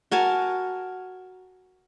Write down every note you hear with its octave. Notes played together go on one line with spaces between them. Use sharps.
F#4 A#4 G#5 A5